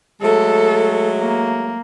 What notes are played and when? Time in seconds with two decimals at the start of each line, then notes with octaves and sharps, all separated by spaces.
0.22 F#3 G#3 A3 A4
1.18 A#3